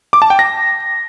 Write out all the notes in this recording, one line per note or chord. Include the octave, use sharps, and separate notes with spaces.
D6
A5
G5
A#6